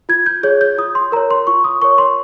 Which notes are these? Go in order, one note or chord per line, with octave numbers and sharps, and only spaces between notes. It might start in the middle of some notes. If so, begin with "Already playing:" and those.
F4 G#6
G6
G#4 C#5 G6
G6
F4 D#6
C6
A#4 C#5 A#5
C6
F4 C#6
D#6
A#4 C#5 C#6
C6